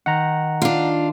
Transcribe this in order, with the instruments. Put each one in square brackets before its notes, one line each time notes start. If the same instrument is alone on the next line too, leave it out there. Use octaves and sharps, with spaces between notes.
[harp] D#3 [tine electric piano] F#5 A#5
[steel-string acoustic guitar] D4 F4